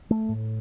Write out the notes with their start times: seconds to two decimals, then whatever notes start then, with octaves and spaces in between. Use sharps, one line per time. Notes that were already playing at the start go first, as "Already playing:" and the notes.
0.11 A3
0.29 A2